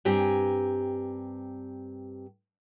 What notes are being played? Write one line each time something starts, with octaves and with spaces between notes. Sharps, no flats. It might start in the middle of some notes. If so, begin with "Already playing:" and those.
G2 C4 G4 G#5 A#5